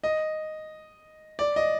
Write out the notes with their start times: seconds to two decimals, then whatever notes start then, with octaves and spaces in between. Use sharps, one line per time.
0.04 D#5
1.39 D5
1.56 D#5